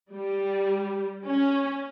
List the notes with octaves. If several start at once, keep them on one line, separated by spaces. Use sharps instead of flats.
G3
C#4